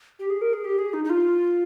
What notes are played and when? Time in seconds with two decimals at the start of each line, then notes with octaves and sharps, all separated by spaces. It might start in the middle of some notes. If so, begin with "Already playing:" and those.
0.19 G4
0.30 G#4
0.41 A#4
0.53 G#4
0.65 G4
0.79 G#4
0.94 D#4
1.05 D#4
1.10 F4